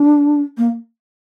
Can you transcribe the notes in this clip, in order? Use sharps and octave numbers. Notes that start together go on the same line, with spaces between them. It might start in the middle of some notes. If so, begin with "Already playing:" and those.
Already playing: D4
A#3